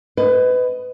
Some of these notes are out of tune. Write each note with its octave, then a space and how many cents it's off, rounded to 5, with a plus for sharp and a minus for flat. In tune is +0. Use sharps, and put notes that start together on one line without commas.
B4 +25 D#5 +0